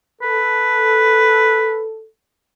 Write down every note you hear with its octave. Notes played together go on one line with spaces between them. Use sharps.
A4 B4